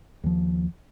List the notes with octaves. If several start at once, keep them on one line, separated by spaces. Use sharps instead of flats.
D#2 F3